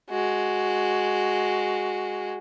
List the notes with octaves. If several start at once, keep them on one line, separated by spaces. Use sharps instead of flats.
G#3 F#4